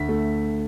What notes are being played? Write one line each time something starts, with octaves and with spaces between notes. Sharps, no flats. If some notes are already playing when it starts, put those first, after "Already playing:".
Already playing: D2 B6
A3